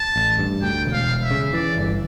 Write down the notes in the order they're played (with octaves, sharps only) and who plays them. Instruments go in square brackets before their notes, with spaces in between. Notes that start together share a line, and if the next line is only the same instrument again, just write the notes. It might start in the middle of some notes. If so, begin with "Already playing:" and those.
Already playing: [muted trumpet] A5
[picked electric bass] A1
G2
[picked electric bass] D2 [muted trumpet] G5
[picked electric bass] E1
[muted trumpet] F5
[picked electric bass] E1
[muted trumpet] E5
[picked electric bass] C#3
[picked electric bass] E3 [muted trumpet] D5
[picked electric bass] G1